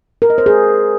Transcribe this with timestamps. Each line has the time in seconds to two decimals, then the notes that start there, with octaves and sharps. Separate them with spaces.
0.22 A#4
0.30 D#5
0.38 C5
0.46 G#4